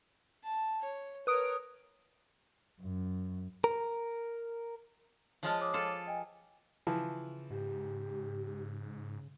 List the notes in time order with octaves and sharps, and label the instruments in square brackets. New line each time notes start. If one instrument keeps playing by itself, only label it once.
[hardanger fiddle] A5
C#5
[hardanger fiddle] A#4 C#5 [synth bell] B4 D#6 D7
[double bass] F#2
[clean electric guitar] A#4
[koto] F3 G#3 F4 [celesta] C#5 D#5 A5
[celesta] C#5 D6 D#6
[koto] F4 G#4 A4
[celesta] D#5 G5 G#5
[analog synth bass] C#3 [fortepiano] E3 F3
[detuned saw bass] G#2 [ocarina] G4